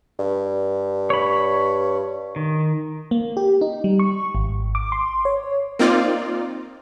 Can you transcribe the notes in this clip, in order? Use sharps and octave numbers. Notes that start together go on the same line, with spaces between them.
G2
C#5 B5
D#3
A#3
G4
D#4
G3
C#6
G#1
D6
C6
C#5
A#3 C4 D#4 F4 D5